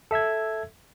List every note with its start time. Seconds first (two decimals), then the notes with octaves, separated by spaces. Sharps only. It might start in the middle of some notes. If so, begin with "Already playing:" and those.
0.11 A4 E5 E6 G#6